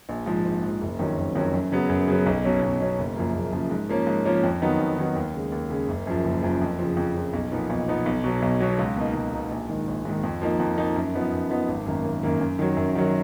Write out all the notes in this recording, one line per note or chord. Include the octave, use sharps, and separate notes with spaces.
A#1
G#2 F3
A#1
G#2 F3
F#1
F2 D#3 F#3 C#4
F#1
F2 D#3 F#3 C#4
F#2
C#3 F#3 B3
F#2
C#3 F#3 B3
B1
B2 F#3 C#4
B1
B2 F#3 C#4
F#1
F#2 C#3 F3 A#3
F#1
F#2 C#3 F3 A#3
G#2
F3 A#3 C#4
G#2
F3 A#3 C#4
F2
D#3 F#3 B3 D#4
F2
D#3 F#3 B3 D#4
D#2
C#3 G#3
D#2
C#3 G#3
F#1
F#2 F3
F#1
F#2 F3
F2
C#3 F3
F2
C#3 F3
B1
A#2 F3 B3 D#4
B1
A#2 F3 B3 D#4
B1
B2 F#3
B1
B2 F#3
C#2
B2 A#3 D#4
C#2
B2 A#3 D#4
A#1
G#2 D#3
A#1
G#2 D#3
F2
F3 A#3 D#4
F2
F3 A#3 D#4
F#2
F3 B3 D#4
F#2
F3 B3 D#4
G#1
F#2 D#3 A#3
G#1
F#2 D#3 A#3
F#2
D#3 F#3
F#2
D#3 F#3